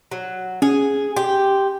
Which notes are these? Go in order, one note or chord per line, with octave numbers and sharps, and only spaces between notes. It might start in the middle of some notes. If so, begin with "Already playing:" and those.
F#3
C#4 G#4
G4 C6